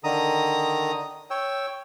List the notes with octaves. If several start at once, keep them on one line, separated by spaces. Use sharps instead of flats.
D3 D#3 A#5 D#6
C#5 G5 E6